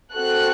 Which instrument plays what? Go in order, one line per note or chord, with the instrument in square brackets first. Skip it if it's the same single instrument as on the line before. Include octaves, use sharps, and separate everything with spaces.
[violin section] C4 F#4 A4 F#6